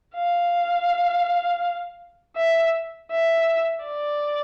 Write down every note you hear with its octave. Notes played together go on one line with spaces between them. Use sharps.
F5
E5
E5
D5